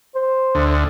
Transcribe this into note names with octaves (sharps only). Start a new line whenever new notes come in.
C5
D2